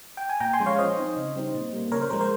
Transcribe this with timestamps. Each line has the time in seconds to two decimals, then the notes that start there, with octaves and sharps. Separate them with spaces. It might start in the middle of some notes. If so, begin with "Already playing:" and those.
0.17 G5
0.29 G#5
0.40 A#2 G5 A#5
0.53 G#5 C6
0.60 F3 G#3 C#4
0.66 C#5 F5
0.78 F3 C5 D#5
0.97 C4 D#4
1.17 C#3
1.36 G3 C4 D#4
1.54 A#2
1.73 G3 A#3
1.92 C#3 A#4 C#5
2.02 C5
2.11 F3 G#3 A#4
2.21 C5